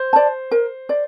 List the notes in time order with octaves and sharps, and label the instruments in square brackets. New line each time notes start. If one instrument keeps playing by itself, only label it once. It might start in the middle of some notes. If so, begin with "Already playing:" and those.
Already playing: [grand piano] C5
[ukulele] D5 A5
A#4
D5